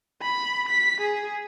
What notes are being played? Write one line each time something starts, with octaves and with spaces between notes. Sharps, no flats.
B5
B6
G#4